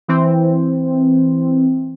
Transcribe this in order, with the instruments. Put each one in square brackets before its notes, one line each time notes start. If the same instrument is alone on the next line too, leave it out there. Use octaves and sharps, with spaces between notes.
[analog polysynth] E3 C4